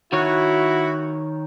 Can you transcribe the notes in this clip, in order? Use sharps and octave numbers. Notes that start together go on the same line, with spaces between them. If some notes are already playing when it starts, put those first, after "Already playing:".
D#3 E4 F#4 C#5